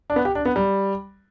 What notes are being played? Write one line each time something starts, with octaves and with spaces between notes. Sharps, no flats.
D4
B3
G4
D4
B3
G3